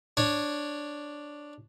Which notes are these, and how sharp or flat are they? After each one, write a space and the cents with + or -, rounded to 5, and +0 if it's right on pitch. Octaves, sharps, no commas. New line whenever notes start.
D4 +0 C#5 -5